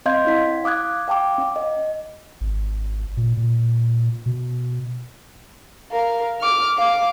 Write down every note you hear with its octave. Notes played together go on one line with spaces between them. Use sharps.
C4 D#5 F5 C6 G6 G#6
C#4 E4 B6
F5 D6 D#6 F#6 G#6
F5 G5 A5 D6
C#4
D#5
G#1
A#2
A#2
B2
A#4 F5
D6 F6
F5 D6